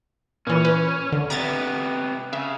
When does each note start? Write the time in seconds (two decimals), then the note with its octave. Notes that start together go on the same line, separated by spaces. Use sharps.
0.47 A#2 E3 C#4
0.65 B4
1.12 D3
1.30 C3 B3 A#5 G#6 A6
2.33 C#3 E5